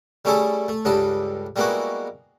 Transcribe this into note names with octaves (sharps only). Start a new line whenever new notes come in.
G3 A3 C#4 E4 G#4 A4
A3
C#2 G2 G3 A4 A5
G3 G#3 A#3 B3 E4 F#4